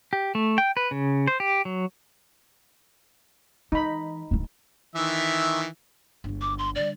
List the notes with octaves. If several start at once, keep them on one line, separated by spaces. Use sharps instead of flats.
G4
A3
G5
B4
C#3
C5
G4
F#3
E3 D#4 B5
D1 D3
D#3 E3 E5
G1 G#3
D6
C6
D3 G3 D5